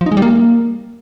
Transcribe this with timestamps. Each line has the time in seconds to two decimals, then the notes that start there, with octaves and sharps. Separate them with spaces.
0.01 F3
0.06 D#4
0.12 G#3
0.17 G3
0.22 A#3